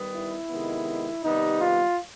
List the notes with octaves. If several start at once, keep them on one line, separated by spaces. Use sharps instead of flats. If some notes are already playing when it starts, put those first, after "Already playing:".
Already playing: D#3 G3 B3
E4
C3 D#3 G#3 B3
C3 D#3 G3 B3 D#4
F4